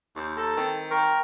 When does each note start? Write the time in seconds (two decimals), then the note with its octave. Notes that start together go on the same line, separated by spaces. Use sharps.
0.16 D#2 C6 E6 G6
0.37 A4 A#5 A6 A#6
0.57 D#3 C4
0.91 A#4 G5 C6 C#6